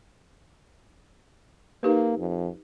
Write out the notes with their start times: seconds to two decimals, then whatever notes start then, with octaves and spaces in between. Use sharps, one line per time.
1.83 A#3 D#4 G4 B4
2.18 F2